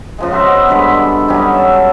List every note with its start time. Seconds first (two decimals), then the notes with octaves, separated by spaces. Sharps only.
0.18 C#3 F3 G#3
0.32 F#4 A#4 C5 E5
0.48 B3
0.69 G2 D3 G#3 B5
1.28 F#3 G3 C#4 D#4
1.54 E5 A5